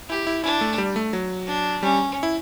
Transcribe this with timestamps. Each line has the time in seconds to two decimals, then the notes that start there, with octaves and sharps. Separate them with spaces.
0.09 E4 G4
0.27 E4
0.44 D4 E4
0.61 A3
0.78 G3
0.96 A3
1.13 F#3
1.47 D4
1.83 G3 C#4
2.23 E4